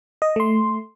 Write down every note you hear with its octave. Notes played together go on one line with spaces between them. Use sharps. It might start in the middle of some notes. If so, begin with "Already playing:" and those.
D#5
A3 C6